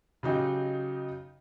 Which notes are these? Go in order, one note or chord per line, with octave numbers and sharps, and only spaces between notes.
C#3 F#3 D#4 G4